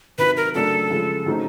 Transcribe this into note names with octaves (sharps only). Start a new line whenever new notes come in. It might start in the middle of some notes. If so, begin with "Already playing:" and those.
C3 D#3 F#3 B4
A#4
F#2 C#3 F#3 A3 D4 A4
C#3 F3 G#3
C#3 F#3 A3 C4 D#4